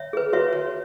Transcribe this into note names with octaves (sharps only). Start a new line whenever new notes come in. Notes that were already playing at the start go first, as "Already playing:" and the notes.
Already playing: C#5 E5
G#4 B4
F#4 C#5 E5
C#5